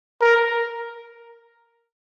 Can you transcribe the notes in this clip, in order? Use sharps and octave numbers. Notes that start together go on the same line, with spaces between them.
A#4